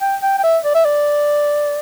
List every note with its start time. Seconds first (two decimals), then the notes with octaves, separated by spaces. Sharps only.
0.01 G5
0.22 G5
0.38 G5
0.43 E5
0.64 D5
0.74 E5
0.85 D5